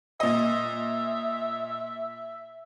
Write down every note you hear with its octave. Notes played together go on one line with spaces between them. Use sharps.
A#2 D#5 E5